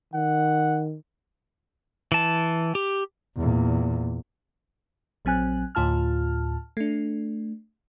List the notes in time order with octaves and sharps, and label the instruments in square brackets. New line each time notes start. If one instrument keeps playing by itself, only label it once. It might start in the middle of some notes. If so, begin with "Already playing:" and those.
[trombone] D#3 [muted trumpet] F#5
[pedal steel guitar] E3 A5
G4
[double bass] E2 A#2
[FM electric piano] A#1 F#3 C4 G#5 F#6
D2 A2 F4 A5 F6
A3 D4